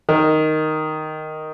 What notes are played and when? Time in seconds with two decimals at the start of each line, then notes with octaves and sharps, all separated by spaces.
0.09 D#3